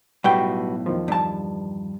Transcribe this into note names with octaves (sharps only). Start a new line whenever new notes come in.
B1 A2 G3 F#4 B4 G5
E2 D#3 F3
G2 A5